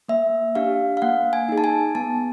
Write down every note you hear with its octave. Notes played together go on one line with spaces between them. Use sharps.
A#3 E5
D4 G4 F5
F5
A#3 F#5
G#5
D#4 G#4
A5
G#5
B3 A5